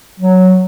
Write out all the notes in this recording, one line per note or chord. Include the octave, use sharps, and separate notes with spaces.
F#3